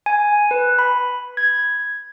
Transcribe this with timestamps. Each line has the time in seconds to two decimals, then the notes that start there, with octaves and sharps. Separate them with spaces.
0.06 G#5
0.51 B4
0.79 B5
1.37 G#6